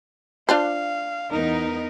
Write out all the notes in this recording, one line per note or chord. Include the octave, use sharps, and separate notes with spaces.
D4 F4 C5 F5
E2 B3 D#4 A#4